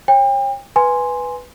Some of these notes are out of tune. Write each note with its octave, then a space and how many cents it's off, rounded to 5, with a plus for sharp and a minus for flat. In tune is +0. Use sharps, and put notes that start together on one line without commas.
C#5 -25 G5 +35
B4 +0 G#5 +0 C6 +0